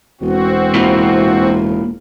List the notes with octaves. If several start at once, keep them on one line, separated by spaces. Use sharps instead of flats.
E1 C4 F#4
A#3 E4 F4